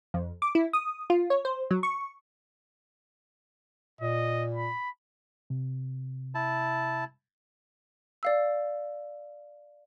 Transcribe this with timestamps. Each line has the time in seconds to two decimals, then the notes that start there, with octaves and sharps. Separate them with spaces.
0.14 F2
0.42 D6
0.55 E4
0.73 D#6
1.10 F4
1.30 C#5
1.45 C5
1.71 F#3
1.83 C#6
4.01 A#2 D#5
4.54 B5
5.50 C3
6.35 E4 A5
8.23 D5 F5 E6